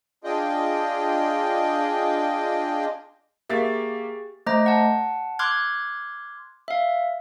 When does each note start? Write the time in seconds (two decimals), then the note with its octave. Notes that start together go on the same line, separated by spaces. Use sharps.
0.24 D4 F4 G#4 D#5 G5
3.49 A#3 G4 G#4 E5 C#6 A6
4.46 A3 C5 D#5 A#5
4.66 F#5 A5
5.39 C6 D6 F6 F#6 G#6
6.68 E5 F5